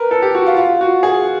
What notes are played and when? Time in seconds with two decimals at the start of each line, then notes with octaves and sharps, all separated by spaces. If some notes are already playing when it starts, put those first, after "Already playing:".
Already playing: A#4 B4
0.11 A4
0.22 G4
0.35 F#4
0.46 F4
0.57 F4
0.81 F#4
1.03 G#4